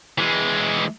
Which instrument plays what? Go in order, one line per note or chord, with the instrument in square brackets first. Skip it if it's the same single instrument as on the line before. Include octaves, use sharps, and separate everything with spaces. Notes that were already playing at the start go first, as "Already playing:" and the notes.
[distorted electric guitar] E3 G#3